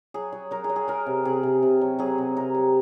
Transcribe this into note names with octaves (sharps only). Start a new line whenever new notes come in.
F#3 G#4
F#3
F#3 A#4
G#4
F#3
G#4
F#3 A#4
C3
C3 G#4
C3
C3
F#3
F#3 G#4
C3
C3 A#4
F#3